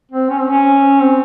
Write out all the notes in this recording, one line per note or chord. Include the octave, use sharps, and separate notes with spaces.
C4
C#4
C4
C#4
C4